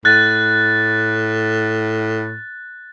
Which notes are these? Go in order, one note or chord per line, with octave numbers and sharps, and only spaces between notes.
A2 F#6 A6